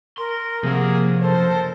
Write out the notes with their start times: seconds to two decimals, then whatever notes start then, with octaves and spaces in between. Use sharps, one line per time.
0.18 A#4 C6
0.63 C3 F3 A#3 G#4 F#5
1.21 F#1 A4 A#4 C5